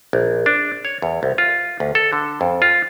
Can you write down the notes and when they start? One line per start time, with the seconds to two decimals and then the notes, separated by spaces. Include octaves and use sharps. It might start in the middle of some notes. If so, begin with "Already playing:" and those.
0.13 A#1
0.46 D4
0.85 C#5
1.02 E2
1.23 C2
1.38 F4
1.80 D2
1.95 A4
2.13 D3
2.41 F2
2.62 F4